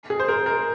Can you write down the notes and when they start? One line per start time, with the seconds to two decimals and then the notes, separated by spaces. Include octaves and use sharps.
0.10 G#4
0.20 C5
0.28 A#4
0.46 A#4